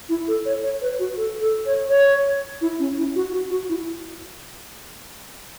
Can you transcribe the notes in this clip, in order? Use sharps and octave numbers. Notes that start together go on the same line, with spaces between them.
E4
A4
C#5
C#5
B4
F#4
A4
A4
C#5
C#5
E4
C#4
E4
F#4
F#4
F#4
E4